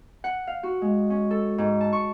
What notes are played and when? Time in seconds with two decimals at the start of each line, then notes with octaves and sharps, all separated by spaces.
0.24 F#5
0.47 F5
0.63 F#4
0.82 G#3
1.10 C#4
1.31 A4
1.58 G#2
1.81 A5
1.93 C#6